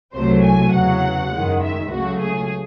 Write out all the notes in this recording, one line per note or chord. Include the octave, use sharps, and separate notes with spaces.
C2 C3 F#3 A3 C5
G#5
E2 C#3 F#3 F#5
F#2 D#3 G#3
E5
C#2 C#3 F#3 A3 F#4
G#4